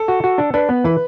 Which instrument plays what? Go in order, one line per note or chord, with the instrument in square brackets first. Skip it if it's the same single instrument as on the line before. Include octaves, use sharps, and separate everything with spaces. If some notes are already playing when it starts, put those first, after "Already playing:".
Already playing: [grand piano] A4
[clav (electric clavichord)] F#4
F#4
D4
[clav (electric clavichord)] D4 [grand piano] B4
[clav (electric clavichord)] B3
[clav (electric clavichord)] E3 [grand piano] B4